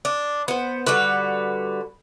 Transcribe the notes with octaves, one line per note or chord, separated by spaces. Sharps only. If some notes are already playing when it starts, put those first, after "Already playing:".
D4
B3 C5
D3 G3 F#4 B4